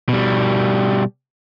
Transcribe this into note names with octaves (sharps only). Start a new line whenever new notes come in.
B2 G3